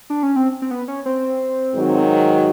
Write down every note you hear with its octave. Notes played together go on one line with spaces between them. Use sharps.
D4
C#4
C4
C4
B3
C#4
C4
G#2 D#3 F#3